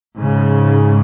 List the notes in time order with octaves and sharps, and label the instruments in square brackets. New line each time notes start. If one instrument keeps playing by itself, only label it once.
[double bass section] G#2 C#3